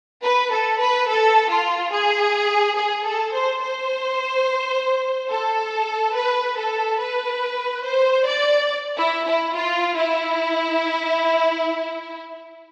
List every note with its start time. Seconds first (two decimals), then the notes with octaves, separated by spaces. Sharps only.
0.22 B4
0.51 A4
0.79 B4
1.08 A4
1.50 F4
1.92 G#4
2.76 G#4
3.05 A4
3.33 C5
3.61 C5
5.31 A4
6.15 B4
6.58 A4
7.00 B4
7.85 C5
8.28 D5
8.98 E4
9.26 E4
9.55 F4
9.97 E4